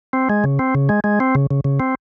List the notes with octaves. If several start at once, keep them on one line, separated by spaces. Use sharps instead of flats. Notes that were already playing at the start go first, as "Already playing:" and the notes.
C4
G#3
C#3
C4
C#3
G#3
G#3
C4
C#3
C#3
C#3
C4